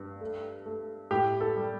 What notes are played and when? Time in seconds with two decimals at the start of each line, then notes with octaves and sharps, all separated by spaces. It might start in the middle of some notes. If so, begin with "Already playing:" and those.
Already playing: G2
0.21 A3
0.66 A3
1.11 A2 G4
1.41 A4
1.56 G3